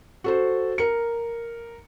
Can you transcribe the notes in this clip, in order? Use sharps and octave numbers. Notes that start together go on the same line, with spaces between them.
F#4 A4 C5
A#4 C#7